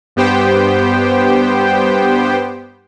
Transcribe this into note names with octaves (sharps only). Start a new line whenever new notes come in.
G2 B3 G4 C5 G5